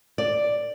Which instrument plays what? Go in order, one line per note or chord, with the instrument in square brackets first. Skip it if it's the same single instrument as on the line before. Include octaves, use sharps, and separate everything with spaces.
[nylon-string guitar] D5